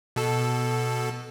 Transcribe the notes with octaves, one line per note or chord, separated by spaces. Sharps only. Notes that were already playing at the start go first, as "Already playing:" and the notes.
B2 A4